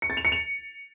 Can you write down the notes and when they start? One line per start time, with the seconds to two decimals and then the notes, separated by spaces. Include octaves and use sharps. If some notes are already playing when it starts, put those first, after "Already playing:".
0.02 C#7
0.10 A6
0.17 F7
0.25 C#7
0.32 F7